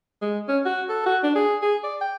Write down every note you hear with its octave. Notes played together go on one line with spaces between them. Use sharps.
G#3
C#4
F#4
A4
F#4
D4
G#4
G#4
D5
G5